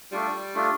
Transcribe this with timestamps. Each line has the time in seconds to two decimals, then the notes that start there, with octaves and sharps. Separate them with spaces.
0.12 G3 A3 D4 F4
0.55 A3 D4 F4